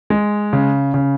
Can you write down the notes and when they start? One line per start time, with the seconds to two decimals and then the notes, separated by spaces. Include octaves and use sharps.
0.10 G#3
0.53 C#3
0.94 C#3